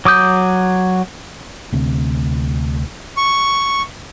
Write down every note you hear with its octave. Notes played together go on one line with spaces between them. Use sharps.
F#3 D6 D#6 G6
D2 C3
C#6